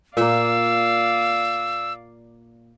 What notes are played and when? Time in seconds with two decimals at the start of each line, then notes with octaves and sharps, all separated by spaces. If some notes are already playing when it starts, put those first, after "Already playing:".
0.17 A#2 A#3 D5 F5 E6